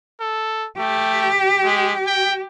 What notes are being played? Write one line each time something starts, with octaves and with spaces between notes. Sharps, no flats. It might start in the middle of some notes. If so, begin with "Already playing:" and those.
A4
A3 G4
G#3
G5